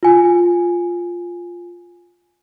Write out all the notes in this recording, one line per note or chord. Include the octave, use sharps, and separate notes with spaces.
F4 G#5